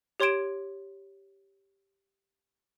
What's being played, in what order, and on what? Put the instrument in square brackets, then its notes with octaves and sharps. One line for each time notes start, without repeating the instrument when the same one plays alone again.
[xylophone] G4 C#5 C6 G#6 D7 E7